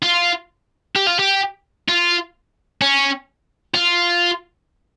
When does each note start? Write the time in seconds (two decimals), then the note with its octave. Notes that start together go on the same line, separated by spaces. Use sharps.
0.03 F4
0.96 G4
1.07 F4
1.19 G4
1.89 F4
2.82 C#4
3.74 F4